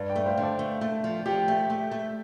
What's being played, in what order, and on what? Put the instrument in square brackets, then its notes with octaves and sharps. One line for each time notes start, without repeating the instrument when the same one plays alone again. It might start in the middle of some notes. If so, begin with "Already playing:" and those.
Already playing: [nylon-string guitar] G2
[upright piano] D5 G5
[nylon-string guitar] A3
[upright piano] C5 F5
[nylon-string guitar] D3
[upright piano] A4 D5
[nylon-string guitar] A3
A3
F3
[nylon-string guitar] F3 [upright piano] G4
[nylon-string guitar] A3
A3
A3